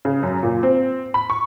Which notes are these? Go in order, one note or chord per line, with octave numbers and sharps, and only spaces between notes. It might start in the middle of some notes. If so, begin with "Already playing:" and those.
C#3
F#2
A#2
C4
B5
C#6